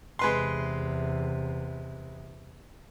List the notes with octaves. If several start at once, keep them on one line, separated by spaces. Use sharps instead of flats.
E2 C3 G#3 B4 C6